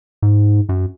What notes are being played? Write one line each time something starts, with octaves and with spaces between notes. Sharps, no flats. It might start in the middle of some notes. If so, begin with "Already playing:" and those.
G#2
F#2